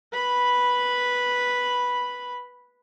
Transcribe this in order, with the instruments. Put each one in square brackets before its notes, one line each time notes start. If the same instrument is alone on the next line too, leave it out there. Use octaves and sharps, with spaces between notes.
[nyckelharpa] B4 B5